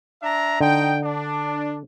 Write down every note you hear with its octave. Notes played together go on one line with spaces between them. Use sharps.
D4 E5 A#5
D3 D#4 G5
D4